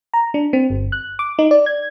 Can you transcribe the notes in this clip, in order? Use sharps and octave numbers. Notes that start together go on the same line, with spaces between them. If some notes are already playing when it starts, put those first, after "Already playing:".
A#5
D4
C4
G1
F#6
D6
D#4
D5
G#6